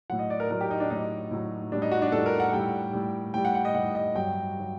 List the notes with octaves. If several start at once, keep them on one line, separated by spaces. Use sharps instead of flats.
A2 F#3 F#5
D#5
D5
A#4
A2 F#3 A#4
G4
D#4
D4
A2 F#3 D#4
A2 F#3
A2 G3 D4
D#4
F#4
D4
A2 G3 A4
A#4
F#5
A2 G3 G5
A2 G3
A2 G3 G5
F#5
F#5
D#5
A2 G3 F#5
D#5
G2 F#3 G5
F#3